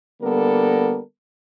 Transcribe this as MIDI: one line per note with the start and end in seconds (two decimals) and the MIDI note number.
0.21 1.00 50
0.21 1.00 55
0.21 1.00 58
0.21 1.00 59
0.21 1.00 69
0.21 1.00 70